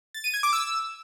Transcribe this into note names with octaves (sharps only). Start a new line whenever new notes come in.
A6
D#7
G#6
D6
E6